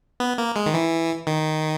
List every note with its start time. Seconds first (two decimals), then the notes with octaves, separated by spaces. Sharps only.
0.20 B3
0.38 A#3
0.56 G#3
0.66 D#3
0.74 E3
1.27 D#3